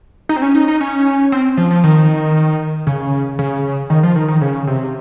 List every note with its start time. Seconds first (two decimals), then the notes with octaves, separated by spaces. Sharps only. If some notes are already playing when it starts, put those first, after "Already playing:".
0.29 D#4
0.36 C4
0.42 C#4
0.55 D#4
0.68 D#4
0.81 C#4
1.32 C4
1.57 F3
1.71 F3
1.84 D#3
2.87 C#3
3.39 C#3
3.90 D#3
4.03 F3
4.16 D#3
4.28 D#3
4.41 C#3
4.67 C3